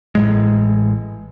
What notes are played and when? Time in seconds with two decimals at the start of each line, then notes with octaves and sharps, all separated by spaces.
0.15 A1 A2 G#3